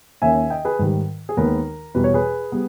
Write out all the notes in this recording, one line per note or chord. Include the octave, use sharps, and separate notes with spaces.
D#2 D#3 A#3 C#4 E5 G#5
D#5 G5
G#4 B4
G#2 D#3 G3
G#4
D#2 D#3 G#3 B3 A#4
E2 B2 G3 B4
C#5
G#4 B4
G3 B3